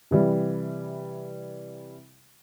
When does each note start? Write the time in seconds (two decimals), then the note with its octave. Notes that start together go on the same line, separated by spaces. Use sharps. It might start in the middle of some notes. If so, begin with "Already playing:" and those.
0.11 C3 E3 G3